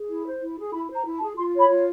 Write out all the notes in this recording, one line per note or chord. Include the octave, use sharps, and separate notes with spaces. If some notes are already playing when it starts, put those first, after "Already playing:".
Already playing: G#4
E4
C5
E4
G#4
E4 B5
C5 A#5
E4
A5
G#4
F4 C6
C#5
B5
F4